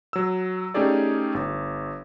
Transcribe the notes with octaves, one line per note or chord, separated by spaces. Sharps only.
F#3 E6
A3 C#4 D#4 G4 G#4 D5
G1